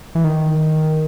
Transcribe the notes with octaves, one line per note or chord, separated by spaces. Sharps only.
E3
D#3